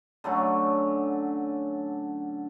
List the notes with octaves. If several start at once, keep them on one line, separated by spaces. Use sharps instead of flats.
D3 F#3 A3 C#4